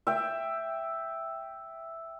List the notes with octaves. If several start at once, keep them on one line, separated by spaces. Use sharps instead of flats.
E5 G5